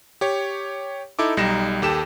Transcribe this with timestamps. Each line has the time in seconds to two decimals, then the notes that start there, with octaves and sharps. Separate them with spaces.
0.21 G4 C#5
1.19 D#4 E4 A4 D6
1.37 B1 G3 D#4 A#6 E7
1.82 D#2 G4 A4 E7